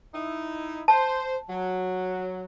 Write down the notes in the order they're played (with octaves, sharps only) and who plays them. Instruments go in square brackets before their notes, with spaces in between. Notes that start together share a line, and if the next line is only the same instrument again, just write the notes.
[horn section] D#4 E4
[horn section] C5 [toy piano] A5
[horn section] F#3